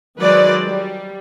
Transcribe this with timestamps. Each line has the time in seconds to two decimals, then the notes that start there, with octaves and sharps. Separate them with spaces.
0.19 D#3 F#3 G#3 B4 C5 D5
0.66 G3